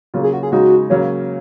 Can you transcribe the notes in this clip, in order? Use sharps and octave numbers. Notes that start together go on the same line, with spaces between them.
C#3 F#3 A#3 F4
G#4
F#4
G#4
C#3 G#3 D#4 F#4
C#3 F#3 A#3 C#4